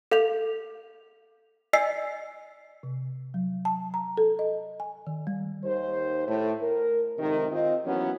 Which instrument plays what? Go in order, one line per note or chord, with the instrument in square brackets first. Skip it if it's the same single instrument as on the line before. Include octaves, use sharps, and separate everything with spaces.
[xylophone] A4 F5 G6 F7
D5 D#5 G#5 E6 B6 C7
[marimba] C3
F#3
A5
A#5
A4
D#5
G#5
D#3
G3
[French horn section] D#2 C5
A2
A#4
F2 G#2 C3 D#3
C4 F4 C5 D#5
D#2 E3 F#3 B3 C#4 C#5